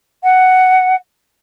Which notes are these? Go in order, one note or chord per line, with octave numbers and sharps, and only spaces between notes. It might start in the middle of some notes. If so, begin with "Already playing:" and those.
F#5